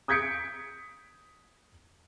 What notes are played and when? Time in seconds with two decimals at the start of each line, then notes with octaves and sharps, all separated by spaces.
0.08 D#6 G6 G#6 B6 C#7 D7